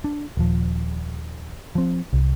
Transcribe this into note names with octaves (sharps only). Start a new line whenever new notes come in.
D4
D#1 F3
F3 C4
C2